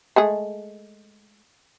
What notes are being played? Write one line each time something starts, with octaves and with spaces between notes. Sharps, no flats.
G#3 A3 G#4